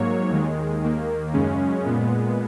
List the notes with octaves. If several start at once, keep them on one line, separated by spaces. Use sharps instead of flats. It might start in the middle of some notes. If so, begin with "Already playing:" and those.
Already playing: G#2 F#3 A#3 C#5
D#2 D#3 G#3
D#2 D#3 A#3
F#2 C#3 G#3 C#4
A#2 G#3 B3